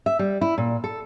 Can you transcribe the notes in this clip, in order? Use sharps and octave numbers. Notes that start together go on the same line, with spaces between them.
E5
G3
E4
A#2
A4